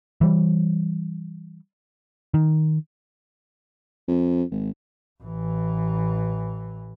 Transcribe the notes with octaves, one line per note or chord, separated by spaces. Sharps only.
E3 G3
D#3
F2
G#1
A1 E3